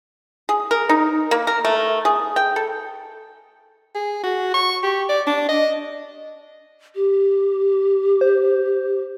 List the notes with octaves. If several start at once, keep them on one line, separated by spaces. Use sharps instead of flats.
G#4
A#4
D#4
A#3
A#4
A3
G#4
G5
A4
G#4
F#4
C#6
G4
D5
D4
D#5
G4
C5